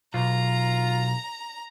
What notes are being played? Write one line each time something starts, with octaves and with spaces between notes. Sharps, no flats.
B1 F4 A#5